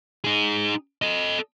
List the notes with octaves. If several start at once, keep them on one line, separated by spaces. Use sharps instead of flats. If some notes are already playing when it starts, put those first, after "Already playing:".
D#4 G#4
A4 D#5